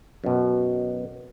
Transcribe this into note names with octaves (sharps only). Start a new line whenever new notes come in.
F#2 B2